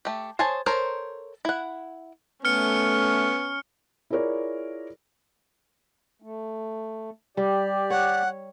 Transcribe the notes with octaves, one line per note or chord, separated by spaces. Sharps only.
A3 G4
G#4 C5 C#5 G#5 A5
A4 A#4 C5 C#5
E4 F#5
A3 B3 C#4 F6 C#7
E4 F4 G#4 A#4 C#5 D5
A3
G3 G4 D5
C#5 F#5